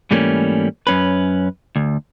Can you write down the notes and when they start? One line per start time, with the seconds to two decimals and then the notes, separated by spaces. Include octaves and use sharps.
0.11 G#2 E3 G3 A3 A#3 C#4
0.87 F#2 C#4 B4
1.76 D2